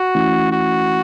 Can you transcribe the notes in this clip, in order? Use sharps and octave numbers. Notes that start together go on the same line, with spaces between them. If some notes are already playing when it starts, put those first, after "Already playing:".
Already playing: F#4
E3 A3 C#4 E4
F#4